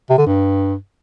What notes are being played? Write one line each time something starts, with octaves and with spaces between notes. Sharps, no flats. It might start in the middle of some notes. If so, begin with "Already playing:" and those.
C3
D3
G2